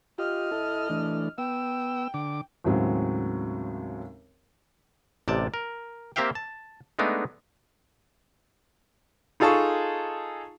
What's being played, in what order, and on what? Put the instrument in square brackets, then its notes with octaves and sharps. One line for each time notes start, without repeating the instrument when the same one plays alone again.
[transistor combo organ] F4 G4 [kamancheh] D#5 F6
[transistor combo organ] E4 A4
E3 A3 D4
[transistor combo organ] B3 E6 [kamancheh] G5
[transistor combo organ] D3 D6
[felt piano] D#2 A2 C#3 F#3 G#3 C4
[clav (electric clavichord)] A1 C3 D5 A5
A#4
A#3 C4 G4 E5 F5 G5
A5
G#3 A3 B3 D4 D#4
[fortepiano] D#4 F4 G#4 A4 A5 C#6